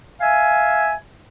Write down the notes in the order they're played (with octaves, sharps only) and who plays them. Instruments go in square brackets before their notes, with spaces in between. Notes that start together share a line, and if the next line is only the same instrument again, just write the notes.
[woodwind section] E5 F5 G#5